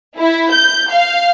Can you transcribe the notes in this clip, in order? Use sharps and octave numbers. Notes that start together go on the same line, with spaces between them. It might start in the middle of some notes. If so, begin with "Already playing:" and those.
E4
G6
F5